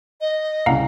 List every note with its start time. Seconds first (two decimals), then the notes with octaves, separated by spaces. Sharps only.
0.21 D#5
0.66 C2 C#3 F5 F#5 A#5